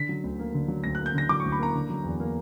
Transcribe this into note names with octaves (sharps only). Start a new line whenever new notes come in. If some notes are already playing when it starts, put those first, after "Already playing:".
Already playing: D3 B6
F#3
D2
A#3
D3
F#3
D2 A#6
A#3 F#6
G6
D3 A#6
F#3 D6
D2 C#6
B5
A#3 A#5
D3
F#3
E2
A#3